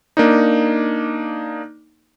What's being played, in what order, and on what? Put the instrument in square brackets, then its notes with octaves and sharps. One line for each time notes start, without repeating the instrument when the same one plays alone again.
[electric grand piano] A#3 D4 D#4